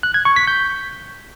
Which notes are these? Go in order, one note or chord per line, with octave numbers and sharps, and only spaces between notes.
F#6
G#6
C#6
B6
G6